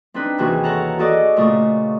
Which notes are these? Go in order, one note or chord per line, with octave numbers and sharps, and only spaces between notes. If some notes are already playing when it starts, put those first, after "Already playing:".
C4 D4 D#4 B4
D#2 C3 E3 F#4 G#4 G#5
A4 C#5 F#5 A5 A#5
F#4 G#4 A4 D5 D#5
A#2 C#3 A3 C#6 D#6